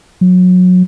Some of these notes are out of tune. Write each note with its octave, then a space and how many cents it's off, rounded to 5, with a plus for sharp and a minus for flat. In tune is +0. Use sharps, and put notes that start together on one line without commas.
F#3 -25